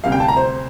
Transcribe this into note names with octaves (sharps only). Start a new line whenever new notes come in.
D2 C3 G3 F5
G5
A5
A#5
C5